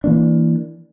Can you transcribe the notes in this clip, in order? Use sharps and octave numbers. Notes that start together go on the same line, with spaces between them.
E3 A#3 D4